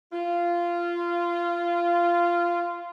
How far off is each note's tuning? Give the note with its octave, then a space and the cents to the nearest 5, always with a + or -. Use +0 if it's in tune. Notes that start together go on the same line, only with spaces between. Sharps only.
F4 -15